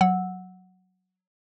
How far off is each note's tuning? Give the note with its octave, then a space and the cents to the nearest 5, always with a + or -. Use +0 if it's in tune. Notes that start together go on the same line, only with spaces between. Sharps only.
F#3 +0 F#5 -5 E6 -10